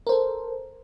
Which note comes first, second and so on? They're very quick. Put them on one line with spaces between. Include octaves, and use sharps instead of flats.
A#4 C5 A4